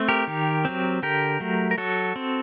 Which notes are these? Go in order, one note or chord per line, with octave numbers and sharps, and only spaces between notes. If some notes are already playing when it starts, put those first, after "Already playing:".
Already playing: A3 C4
G4 A#4
D#3
F#3 C4
D3 G4 A#4
F#3 A3
A#4
F#3 F#4 A4
C4